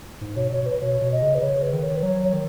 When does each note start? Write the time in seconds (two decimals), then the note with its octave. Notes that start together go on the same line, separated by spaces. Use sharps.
0.21 G#2
0.36 B2 C#5
0.51 B2 C#5
0.66 B4
0.81 B2 C#5
1.02 B2
1.12 D#5
1.22 C#3
1.35 B4
1.42 C#3 C#5
1.62 B4
1.73 D#3
1.83 C#5
1.96 B4
2.03 F#3 C#5
2.23 C#5
2.33 D#3